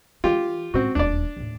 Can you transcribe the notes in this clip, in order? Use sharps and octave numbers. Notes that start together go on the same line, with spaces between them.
E3 F4 G4
A2 C4 F#4
D#1 E2 D4 D5
D#2 A2